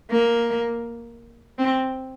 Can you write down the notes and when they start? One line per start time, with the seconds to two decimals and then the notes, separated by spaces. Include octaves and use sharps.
0.11 A#3
1.59 C4